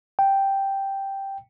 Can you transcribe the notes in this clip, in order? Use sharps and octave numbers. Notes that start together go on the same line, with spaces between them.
G5